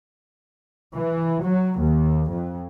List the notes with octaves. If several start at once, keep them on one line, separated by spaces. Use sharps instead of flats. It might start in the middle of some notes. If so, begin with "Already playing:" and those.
E3
F#3
D#2
F2